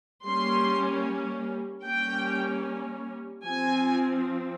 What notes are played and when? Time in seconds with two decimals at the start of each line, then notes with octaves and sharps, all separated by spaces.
0.25 G3 A#3 C#4 C6
1.85 G3 A#3 C#4 G5
3.45 F3 C4 G#5